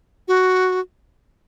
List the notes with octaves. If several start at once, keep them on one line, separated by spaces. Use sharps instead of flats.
F#4